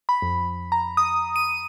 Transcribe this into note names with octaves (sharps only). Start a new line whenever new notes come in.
B5
F2
A#5
D#6
D#7